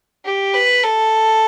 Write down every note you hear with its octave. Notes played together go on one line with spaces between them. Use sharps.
G4
B4
A4